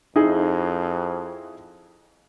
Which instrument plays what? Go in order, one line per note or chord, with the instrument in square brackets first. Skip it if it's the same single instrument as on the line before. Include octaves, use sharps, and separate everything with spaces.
[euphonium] F2 [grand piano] D#4 E4 G#4